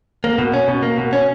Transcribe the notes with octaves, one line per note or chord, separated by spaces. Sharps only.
A#3
B2
C#4
B2
A#3
B2
C#4